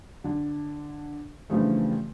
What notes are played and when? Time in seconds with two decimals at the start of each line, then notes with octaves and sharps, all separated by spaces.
0.24 D3 D4
1.50 G2 C#3 E3 F3 G3 A3